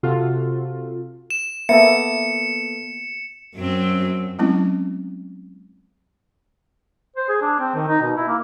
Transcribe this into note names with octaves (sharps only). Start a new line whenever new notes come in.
C3 F4 F#4 A4
E7
A#3 B3 A4 E5 C#7
F#2 F#3 C4
F#3 G#3 A3 C4 C#4 E4
C5
G#4
D4
C4
D#3
D#4
B2
E4
A#3